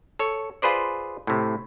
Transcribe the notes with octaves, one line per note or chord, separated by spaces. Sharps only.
A4 C#5
F4 G#4 B4 C5 D5
A2 C3